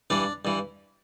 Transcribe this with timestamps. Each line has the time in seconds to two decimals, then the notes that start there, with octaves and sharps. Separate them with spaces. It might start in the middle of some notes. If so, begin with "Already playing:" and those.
0.10 G2 E3 D4
0.45 G2 E3